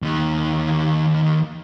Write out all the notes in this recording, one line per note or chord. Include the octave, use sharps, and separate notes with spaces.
D#2 D#3